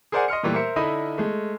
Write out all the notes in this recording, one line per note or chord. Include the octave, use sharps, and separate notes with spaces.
G#4 A#4 C5 D5 F#5 G#5
D#5 C6 F6 C#7
A#2 E3 G3 A3
A#4 C5 E5 C#7
D3 D#4 E4 D#5 B5
G#3 A3